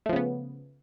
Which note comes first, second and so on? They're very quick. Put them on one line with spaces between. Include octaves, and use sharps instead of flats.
A3 F3 C#3 B3